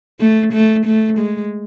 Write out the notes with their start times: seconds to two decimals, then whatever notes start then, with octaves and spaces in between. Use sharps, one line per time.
0.20 A3
0.53 A3
0.86 A3
1.18 G#3